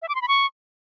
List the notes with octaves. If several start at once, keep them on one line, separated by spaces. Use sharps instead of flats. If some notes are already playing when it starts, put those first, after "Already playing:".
E5
D6
C6
B5
C#6